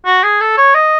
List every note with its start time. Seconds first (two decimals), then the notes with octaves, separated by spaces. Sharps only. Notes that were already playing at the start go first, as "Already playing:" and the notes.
0.05 F#4
0.23 G#4
0.40 A4
0.57 C#5
0.74 D#5